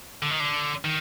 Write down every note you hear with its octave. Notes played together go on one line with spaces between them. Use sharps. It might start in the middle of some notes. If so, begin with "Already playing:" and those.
D3
D#3
D3
D#3